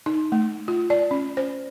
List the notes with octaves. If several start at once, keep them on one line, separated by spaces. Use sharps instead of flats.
D#4
A3
F4
D5
C#4
C5